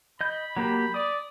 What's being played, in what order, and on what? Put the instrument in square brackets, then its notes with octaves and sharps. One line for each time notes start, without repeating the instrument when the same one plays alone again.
[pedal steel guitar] D#5 G6 [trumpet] B5
[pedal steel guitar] F#3 A#3 G4
[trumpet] D5 [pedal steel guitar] D#6